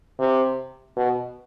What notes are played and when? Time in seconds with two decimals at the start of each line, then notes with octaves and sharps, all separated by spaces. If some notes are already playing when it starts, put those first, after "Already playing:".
0.20 C3
0.97 B2